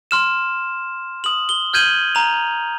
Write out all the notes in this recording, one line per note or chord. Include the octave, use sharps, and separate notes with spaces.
C6 F6 E7
D#6 F#7
G7
F6 G6 G#6 D#7 F#7 G7
A#5 F7